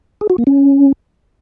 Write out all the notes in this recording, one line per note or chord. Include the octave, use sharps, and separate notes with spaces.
G#4
F#4
A#3
C#4